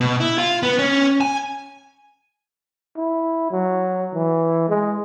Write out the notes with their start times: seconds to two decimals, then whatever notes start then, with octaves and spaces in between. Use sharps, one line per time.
0.01 B2
0.20 E4
0.38 F4
0.63 B3
0.79 C#4
1.21 G#5
2.96 E4
3.51 F#3
4.14 E3
4.68 G#3